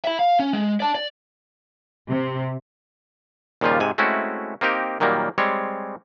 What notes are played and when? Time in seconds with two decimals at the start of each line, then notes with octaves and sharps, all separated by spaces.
0.05 E5 B5
0.19 F5
0.39 C#4
0.53 G#3
0.80 D5 A5
0.95 D5
2.11 C3
3.61 D#2 A#2 C#3 F3 G3 F4
3.80 G#2 C3 G#5
3.98 G#3 A3 C4 C#4 E4 F#4
4.61 A#3 C4 D#4 G4 A#4
5.00 A#2 D#3 F#3 G3 A#3
5.38 G3 G#3 C4 C#5